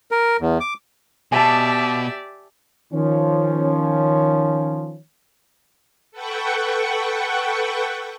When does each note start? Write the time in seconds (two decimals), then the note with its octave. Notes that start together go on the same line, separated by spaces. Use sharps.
0.11 A#4
0.41 E2
0.60 D6
1.32 B2 G4 D5 E5 G#5 A5
2.93 D#3 F3 C#4
6.12 A4 B4 F#5 G5 C#6